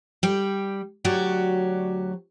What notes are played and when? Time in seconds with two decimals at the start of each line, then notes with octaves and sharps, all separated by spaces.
0.23 G3 G5
1.04 D2 F#3 F#4 G4 C#5 D5